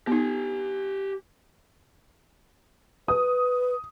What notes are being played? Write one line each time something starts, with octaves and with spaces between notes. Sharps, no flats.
B3 D#4 G4 G#5
B4 D#6